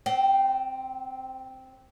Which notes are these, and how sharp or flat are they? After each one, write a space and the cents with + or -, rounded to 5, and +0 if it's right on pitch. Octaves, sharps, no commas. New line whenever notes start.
C4 +0 G5 -40